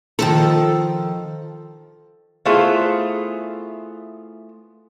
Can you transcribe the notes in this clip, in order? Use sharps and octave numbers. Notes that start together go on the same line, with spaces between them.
D#3 F3 A4
A3 B3 E4 F4 G#4 C5